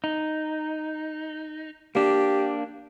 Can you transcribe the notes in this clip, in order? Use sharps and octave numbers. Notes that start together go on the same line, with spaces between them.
D#4
A#3 D4 G4